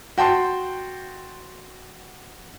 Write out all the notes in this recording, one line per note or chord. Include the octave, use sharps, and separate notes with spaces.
F#4 G5 A5 C6